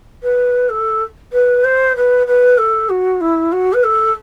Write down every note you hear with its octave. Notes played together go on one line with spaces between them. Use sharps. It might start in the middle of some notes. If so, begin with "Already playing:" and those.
B4
A4
B4
C5
B4
B4
A4
F#4
E4
F#4
B4
A4